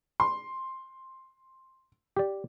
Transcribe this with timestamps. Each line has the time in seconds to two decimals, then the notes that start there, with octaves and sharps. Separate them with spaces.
0.20 C6
2.17 G4 D5